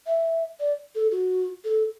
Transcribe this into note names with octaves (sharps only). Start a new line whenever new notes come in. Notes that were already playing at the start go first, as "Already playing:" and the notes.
E5
D5
A4
F#4
A4